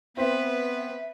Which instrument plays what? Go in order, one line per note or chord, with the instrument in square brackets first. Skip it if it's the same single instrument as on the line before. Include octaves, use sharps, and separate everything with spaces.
[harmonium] B3 [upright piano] C4 [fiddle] B4 [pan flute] E5